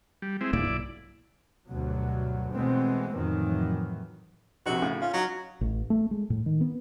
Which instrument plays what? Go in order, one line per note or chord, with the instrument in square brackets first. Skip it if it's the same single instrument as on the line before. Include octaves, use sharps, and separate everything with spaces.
[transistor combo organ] G3
G#3 C4 E4
[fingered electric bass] C#2 G2 A#3 [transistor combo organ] E4 D5
[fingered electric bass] B1
[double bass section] D2 G2 B2 F#3
B2 E3 G#3 A3 B3 C4
F2 A2 D#3 E3 F#3
[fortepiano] A#1 C3 [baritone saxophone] F#4
[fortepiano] A2 C#3
[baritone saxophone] C#4 [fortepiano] F4
[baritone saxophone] F#3 [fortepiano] D#4
[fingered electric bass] A1
A3
G#3
A2
D#3
B3